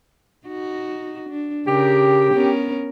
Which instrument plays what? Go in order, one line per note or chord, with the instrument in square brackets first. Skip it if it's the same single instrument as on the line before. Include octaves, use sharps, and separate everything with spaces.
[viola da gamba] D#4 F#4
D4
[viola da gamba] C#3 A#4 [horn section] G4
[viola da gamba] B3 C#4 A#4